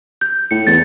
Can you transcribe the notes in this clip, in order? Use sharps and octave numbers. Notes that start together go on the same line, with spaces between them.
G6
A2 C#7
E2 A6